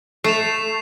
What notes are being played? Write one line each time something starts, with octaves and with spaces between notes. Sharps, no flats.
A3 C7 E7 F7